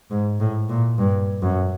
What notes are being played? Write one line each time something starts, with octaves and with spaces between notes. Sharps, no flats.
G#2
A2
A#2
G2
F#2